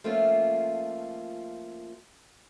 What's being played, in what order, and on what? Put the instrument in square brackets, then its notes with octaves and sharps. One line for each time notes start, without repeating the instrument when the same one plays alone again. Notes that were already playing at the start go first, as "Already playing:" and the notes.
[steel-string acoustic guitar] F3 A3 A#3 C#4 F4